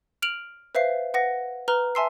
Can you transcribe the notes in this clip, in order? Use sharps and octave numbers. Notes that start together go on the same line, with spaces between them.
F6 D7 F7 F#7
B4 C5 E5 F5 C7
B4 F#5 A#6
B4 A#5 F6 G7
E5 G#5 A5 C6 E6 C7